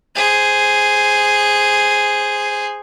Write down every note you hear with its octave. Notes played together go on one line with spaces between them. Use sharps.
G#4 C5